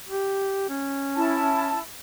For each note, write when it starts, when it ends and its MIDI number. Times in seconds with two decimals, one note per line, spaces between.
0.09 0.68 67
0.69 1.77 61
1.16 1.80 64
1.16 1.80 81